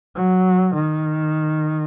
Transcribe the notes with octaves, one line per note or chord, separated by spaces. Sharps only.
F#3
D#3